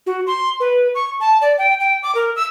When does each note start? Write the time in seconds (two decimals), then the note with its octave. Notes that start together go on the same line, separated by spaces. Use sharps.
0.06 F#4
0.27 C6
0.60 B4
0.95 C#6
1.20 A5
1.42 D5
1.58 G5
1.80 G5
2.03 D6
2.15 A#4
2.36 E6